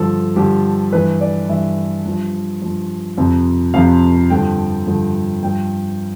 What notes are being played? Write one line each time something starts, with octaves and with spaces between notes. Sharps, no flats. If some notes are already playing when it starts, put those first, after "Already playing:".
Already playing: G2 D3 F3 A4
G2 D3 F3 G4
G2 E3 B4
D5
G2 E3 E5
G2 F3
G2 F3
F2 C3 F3
F2 C3 F3 F5
G2 D3 F3 G5
G2 D3 F3
G2 F3 G5